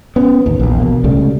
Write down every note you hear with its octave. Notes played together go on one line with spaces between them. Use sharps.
B3 C#4
A1 D#2
A#1 E2
B2 A#3
C#2 C#3 G3 A3